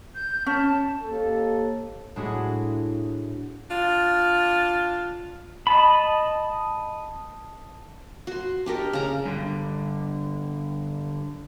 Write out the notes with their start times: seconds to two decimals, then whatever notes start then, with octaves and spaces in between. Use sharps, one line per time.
0.15 G6
0.46 C#4 A5
1.03 D#2 A4
2.16 A2 G#3 D4 E4 F#4 G#4
3.71 D4 F4
5.67 D#5 A5 B5
8.27 F#4 C6
8.66 D4 G4 A#4 D#5
8.93 C#3 A#5
9.26 G2 D3